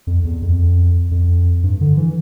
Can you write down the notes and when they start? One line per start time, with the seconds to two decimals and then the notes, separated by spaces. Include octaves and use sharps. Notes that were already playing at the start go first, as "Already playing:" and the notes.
0.07 F2
0.24 E2
0.42 F2
1.11 F2
1.63 G2
1.81 D3
1.97 E3